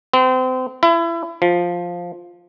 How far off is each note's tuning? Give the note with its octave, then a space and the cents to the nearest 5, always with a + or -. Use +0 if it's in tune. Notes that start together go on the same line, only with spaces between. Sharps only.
C4 -30
E4 +30
F3 +5